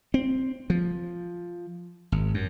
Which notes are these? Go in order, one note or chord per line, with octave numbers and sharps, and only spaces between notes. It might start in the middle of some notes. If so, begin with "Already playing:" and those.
C4
F3
G#1
F#2